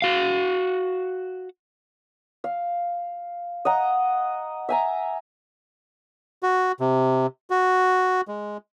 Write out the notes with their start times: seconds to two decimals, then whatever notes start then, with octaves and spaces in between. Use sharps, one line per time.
0.02 F#4 F5
2.44 F5
3.65 D#5 F#5 A#5
4.69 E5 G#5 A#5
6.43 F#4
6.80 C3
7.50 F#4
8.28 G#3